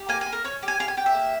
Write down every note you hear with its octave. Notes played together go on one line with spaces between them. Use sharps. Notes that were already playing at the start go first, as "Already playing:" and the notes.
Already playing: G4
A#3 G#5
G#5
A#3
A#4
C#4 C#5
G4
G#5
G4 F5
G#5
G4 G5
E5
A#3